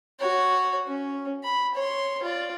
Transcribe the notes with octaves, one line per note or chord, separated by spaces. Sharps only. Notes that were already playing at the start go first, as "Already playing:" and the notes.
F#4 C#5
C#4
B5
C#5 C6
F4 D5